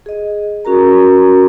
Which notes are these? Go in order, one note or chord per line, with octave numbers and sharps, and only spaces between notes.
G#4 D#5
C#4 F#4 A#4 A#5